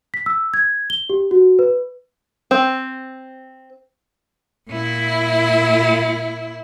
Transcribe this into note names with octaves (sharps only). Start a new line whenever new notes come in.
B6
E6
G#6
G7
G4
F#4
B4
C4
A#2 E4